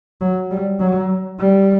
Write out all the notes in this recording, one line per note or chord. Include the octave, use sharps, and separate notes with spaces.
F#3
G3
F#3
G3